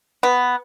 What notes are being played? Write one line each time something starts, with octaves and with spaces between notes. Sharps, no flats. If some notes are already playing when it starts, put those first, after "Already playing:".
B3